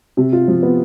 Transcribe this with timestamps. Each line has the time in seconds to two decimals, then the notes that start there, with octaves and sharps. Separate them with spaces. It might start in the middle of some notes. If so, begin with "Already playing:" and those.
0.17 C3
0.33 F4
0.48 F3
0.63 B3